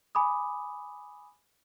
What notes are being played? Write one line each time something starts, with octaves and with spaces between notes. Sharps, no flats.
G#5 B5 D6 D#6